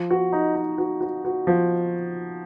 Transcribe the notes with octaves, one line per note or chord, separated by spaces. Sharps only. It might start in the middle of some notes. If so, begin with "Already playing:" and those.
Already playing: F3
F#4
D#4
D#4
F#4
F#4
F#4
F3